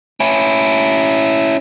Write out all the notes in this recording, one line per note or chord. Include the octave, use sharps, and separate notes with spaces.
C#4 E4